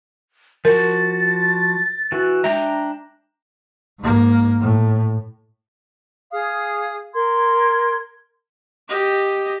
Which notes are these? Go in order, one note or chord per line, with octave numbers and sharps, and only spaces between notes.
F3 F#4 A#4 A6
E3 F#4
G#3 D4 E5 G5 A#5
G#2 A#3
A2
G#4 F5 D#6
A#4 C6 G#6
G4 D#5